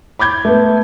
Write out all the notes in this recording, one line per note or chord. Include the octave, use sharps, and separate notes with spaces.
B5 D6 G6 G#6
A3 B3